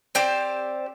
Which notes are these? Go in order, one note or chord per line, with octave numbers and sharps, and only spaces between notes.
C4 G4 C5 D5